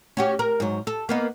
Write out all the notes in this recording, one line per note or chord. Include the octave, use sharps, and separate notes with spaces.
C#4 F#4 G4
A#4
G#2 F#3
A4
A#3 B3 D#4